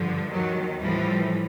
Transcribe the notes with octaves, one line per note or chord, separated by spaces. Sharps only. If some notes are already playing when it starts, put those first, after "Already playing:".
Already playing: G2 D3 F3
D#2 D#3 F#3
A2 E3 F3 G3